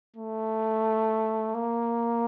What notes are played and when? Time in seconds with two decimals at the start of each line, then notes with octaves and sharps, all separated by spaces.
0.16 A3
1.54 A#3